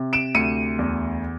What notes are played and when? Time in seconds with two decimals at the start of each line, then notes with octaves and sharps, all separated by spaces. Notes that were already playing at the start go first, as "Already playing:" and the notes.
Already playing: C3
0.13 D7 E7
0.35 D2 C#7 D#7
0.79 E2